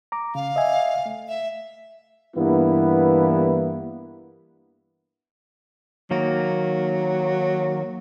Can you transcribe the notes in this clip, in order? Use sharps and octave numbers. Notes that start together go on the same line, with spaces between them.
A#5 D6
C#3 F5
D#5 E5 G#5
A3
E5
G2 E3 A#3 B3 E4
D#3 F#3 A#3 A#4